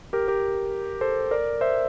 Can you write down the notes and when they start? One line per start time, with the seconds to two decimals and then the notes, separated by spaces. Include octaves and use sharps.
0.13 G4 A#4
0.28 G4 A#4
1.01 A4 C5
1.31 A#4 D5
1.61 C5 E5